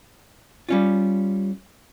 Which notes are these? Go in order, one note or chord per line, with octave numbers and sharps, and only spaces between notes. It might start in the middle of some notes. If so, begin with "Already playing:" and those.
G3 C#4 F4